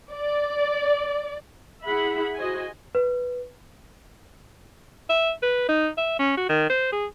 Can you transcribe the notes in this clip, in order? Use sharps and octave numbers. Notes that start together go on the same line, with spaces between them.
D5
E4 G#4 E5 F#5 B5
F#4 C5 D#5 G#5
B4
E5
B4
D#4
E5
C#4
F#4
D#3
C5
G#4